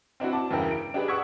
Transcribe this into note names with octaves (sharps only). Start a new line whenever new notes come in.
C4 D4 E4 F#4
A5 D6
E2 G2 C#3 E4 A#4 G5
D7
D4 G4 G#4 B4 D5
F#5 C#6 D#6 E6 G#6 B6